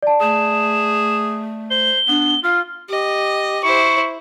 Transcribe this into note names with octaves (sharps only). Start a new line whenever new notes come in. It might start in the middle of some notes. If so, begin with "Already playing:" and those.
D5 A5
A3 G#4 E7
C5 G7
B3 D4
F4 F5 F6
G4 D#5
E4 C5 C#6